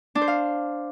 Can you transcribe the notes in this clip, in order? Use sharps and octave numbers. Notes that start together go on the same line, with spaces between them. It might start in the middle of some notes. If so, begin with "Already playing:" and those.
D4
C5
F5